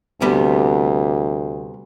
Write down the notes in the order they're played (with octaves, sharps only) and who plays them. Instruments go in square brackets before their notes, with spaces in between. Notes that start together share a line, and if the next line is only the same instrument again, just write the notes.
[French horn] D2 [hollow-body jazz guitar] C3 G3 B3